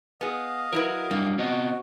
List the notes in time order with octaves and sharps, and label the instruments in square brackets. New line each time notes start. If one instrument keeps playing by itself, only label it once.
[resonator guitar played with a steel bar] B3 G#4 [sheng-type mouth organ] D#5 F5
[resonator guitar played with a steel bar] F#3 E4 B4 [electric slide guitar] A#4
[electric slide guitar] F#3 G3 D4 [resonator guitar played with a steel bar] A#3
[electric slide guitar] B3 C4 D#5 [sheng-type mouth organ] F#4